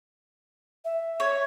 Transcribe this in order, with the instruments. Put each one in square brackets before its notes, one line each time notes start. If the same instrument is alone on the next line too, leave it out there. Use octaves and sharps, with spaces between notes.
[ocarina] E5
[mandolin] C#5